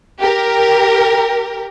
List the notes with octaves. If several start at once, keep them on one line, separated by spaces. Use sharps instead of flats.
G4 A#4